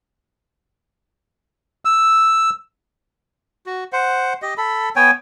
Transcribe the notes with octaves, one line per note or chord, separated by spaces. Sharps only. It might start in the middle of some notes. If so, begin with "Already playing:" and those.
E6
F#4
C5 F#5
G4 D#5
A4 B5
B3 C#5 G5 G#5